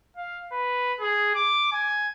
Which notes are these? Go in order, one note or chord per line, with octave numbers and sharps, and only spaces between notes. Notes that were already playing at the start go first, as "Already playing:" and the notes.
F5
B4
G#4
D6
G#5